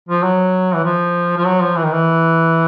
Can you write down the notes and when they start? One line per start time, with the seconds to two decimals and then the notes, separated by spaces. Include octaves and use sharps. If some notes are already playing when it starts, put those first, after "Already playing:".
0.09 F3
0.23 F#3
0.75 E3
0.84 F3
1.37 F3
1.46 F#3
1.62 F3
1.77 E3
1.84 D#3
1.93 E3